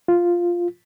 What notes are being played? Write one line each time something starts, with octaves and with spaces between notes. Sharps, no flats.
F4